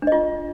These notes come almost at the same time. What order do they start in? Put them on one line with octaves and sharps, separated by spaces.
D4 D#5 F4